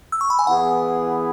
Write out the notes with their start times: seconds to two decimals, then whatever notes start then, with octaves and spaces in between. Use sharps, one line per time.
0.12 E6
0.21 C#6
0.30 B5
0.39 G#5
0.47 E3 B3 E4 G#4 F#5